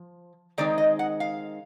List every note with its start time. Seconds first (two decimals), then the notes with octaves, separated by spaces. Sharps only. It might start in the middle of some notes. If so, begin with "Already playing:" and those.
Already playing: F3
0.58 D#3 G#3 C4 D#4 D5
0.78 D#5
0.99 F#5
1.20 F5